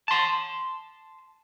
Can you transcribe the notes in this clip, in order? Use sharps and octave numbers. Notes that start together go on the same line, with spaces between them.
A5 C6